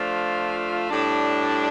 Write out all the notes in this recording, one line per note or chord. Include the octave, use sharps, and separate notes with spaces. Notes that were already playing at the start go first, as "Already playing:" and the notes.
Already playing: F3 A3 D4 F4
A2 G3 D4